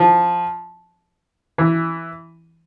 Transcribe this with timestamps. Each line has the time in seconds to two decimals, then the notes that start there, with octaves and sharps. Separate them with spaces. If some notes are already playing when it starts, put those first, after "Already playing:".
Already playing: F3
1.58 E3